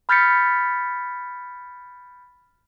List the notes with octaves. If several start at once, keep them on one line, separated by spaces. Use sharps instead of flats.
B5 F6 G6 A6 B6 C#7